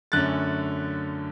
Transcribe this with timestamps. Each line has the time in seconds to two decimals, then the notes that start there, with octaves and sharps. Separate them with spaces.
0.12 F#2 D3 A3 C#4 F#6 A6